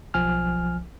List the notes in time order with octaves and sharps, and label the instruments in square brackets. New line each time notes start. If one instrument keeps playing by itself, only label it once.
[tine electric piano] B1 F3 G#5 F6